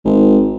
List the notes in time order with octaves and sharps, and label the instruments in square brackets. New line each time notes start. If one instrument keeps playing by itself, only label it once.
[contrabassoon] G#1